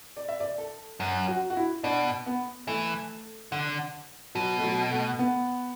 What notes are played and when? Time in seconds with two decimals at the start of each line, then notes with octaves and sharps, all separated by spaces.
0.17 D5
0.29 E5
0.40 D5
0.58 A4
1.00 F#2
1.28 F#4
1.50 F#4
1.57 E4
1.83 B2 D4
2.26 B3
2.67 E3 A3
3.52 D3
4.35 B2 F#3
4.58 A3
4.64 F#3
4.91 A3
5.19 B3